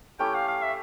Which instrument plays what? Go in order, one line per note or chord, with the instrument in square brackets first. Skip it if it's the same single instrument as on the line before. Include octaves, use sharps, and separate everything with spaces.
[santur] A3 C#4 E4 G4 [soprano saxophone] G5
[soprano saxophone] F5
F5
E5